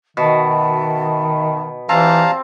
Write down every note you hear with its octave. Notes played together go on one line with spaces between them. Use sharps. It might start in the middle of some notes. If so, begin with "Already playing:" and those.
B2 D#3 F#4 E5 A5
E3 C4 F4 G4 D5 F5 A5 A#5